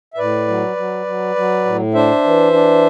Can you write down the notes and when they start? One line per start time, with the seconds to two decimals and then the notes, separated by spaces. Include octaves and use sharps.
0.14 E5
0.18 A2 B4 D5
0.48 F#3
0.76 F#3
1.06 F#3
1.36 F#3
1.65 A2
1.94 D4 C5 E5
2.24 E3
2.53 D4